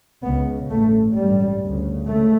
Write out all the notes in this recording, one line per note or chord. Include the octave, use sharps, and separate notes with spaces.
C#2 C#3 B3
A1 G2 A3
A1 G2 G3
D2 C#3
C#3 A3